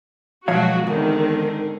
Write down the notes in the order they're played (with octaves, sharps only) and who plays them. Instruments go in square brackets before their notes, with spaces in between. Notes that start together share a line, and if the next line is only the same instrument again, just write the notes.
[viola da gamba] B2 F#3 G#3 [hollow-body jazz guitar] F3 C#5 F5 [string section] F#4
[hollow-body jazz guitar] E2 [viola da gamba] G#2 D3 C4 [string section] D#3